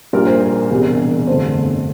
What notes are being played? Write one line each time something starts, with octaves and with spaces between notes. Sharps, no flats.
A#1 A#2 G3 A#3 A#4
C5
A#4
E1 E2 C3 G3
G1 F2 D3 A3 C5